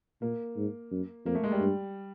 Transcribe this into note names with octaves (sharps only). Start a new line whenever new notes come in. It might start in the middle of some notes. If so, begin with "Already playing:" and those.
A#2 A#3
G#2
F#2
F2 A#3
A3
G#3
G3
G2